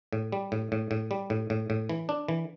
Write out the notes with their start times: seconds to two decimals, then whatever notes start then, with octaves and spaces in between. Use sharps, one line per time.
0.13 A2
0.32 G3
0.52 A2
0.72 A2
0.91 A2
1.11 G3
1.30 A2
1.50 A2
1.70 A2
1.89 E3
2.09 D4
2.28 E3